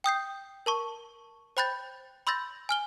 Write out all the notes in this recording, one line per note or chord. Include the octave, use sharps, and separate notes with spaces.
G5 D#6 G6 C7
A#4 A5 C#6
C5 G5 B5 F#6 G6 A6
B5 C6 E6 G6 A6 A#6
G#5 F6 G7